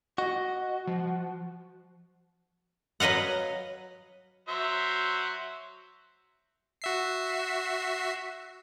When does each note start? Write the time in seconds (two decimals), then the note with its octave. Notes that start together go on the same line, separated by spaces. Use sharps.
0.18 F#4 D#5
0.87 F3
3.00 F#3 B4 D#5 F5 F#5
4.48 F#3 C5 E5
6.82 F#4 E5 C7